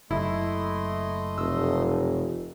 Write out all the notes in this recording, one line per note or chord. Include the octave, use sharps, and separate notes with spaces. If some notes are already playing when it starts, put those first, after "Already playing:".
F#1 A3 E4 D#5 C6
F1 E6